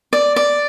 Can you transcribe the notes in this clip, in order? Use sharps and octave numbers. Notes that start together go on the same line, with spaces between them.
D5
D5